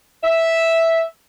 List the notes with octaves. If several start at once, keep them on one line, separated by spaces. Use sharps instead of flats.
E5